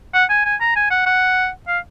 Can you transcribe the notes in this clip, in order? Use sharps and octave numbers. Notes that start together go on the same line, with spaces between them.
F#5
G#5
G#5
A#5
G#5
F#5
F#5
F5